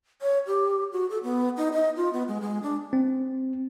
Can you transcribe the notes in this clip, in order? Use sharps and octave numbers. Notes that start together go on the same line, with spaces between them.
C#5
G4
F#4
A4
B3
D#4
D#5
F4
B3
G#3
G#3
D4
C4